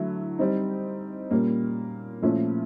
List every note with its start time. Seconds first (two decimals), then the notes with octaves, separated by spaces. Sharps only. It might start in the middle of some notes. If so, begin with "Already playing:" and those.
Already playing: D3 F#3 A3 E4
0.39 G3 C4 D#4
1.31 A#2 G3 A#3 C#4
2.22 A#2 F3 A3 C#4 E4